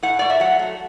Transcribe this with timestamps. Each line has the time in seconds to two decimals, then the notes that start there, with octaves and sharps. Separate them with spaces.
0.03 A2 F#5
0.19 A3 D5
0.30 E5
0.40 F#3 F#5
0.59 A3